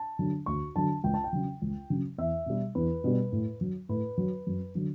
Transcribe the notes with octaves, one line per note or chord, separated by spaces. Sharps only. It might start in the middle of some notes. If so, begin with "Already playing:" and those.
Already playing: A5
D3 F#3
D2 C#6
D3 F#3 A5
C#2 G5
A5
G5
C#3 F#3
C#2
C#3 F#3
E2 E5
B2 G3
E2 B4
B2 G3
A2
F#3
A2 B4
F#3
F#2
D3 F#3